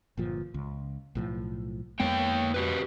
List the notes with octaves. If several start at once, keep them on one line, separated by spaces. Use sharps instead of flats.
G1 A#2 F3
C#2
B1 A2 F3
F2 G#3 A#3 B3 C#5 G5
F#4 G4 B4